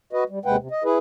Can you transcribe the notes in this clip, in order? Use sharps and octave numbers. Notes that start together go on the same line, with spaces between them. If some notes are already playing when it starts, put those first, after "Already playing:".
F#4 B4 D#5
G3
D#2 C3 G#3 B4 F#5 G5
C3
D#5
E4 G#4 B4